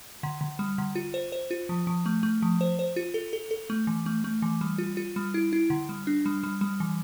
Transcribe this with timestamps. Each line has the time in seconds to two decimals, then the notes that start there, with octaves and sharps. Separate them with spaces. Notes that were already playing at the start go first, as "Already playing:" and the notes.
0.23 D3
0.41 D3
0.59 G3
0.78 D3
0.95 F4
1.14 C5
1.32 C5
1.51 F4
1.69 F3
1.87 F3
2.06 A3
2.23 A3
2.42 F3
2.61 C5
2.79 C5
2.96 F4
3.14 A4
3.33 A4
3.51 A4
3.70 A3
3.87 E3
4.06 A3
4.24 A3
4.42 E3
4.61 G3
4.78 F4
4.97 F4
5.16 G3
5.34 E4
5.53 E4
5.70 D3
5.89 G3
6.07 D4
6.26 G3
6.43 G3
6.61 G3
6.80 E3